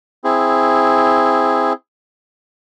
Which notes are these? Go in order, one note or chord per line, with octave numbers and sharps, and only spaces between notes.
C4 E4 G#4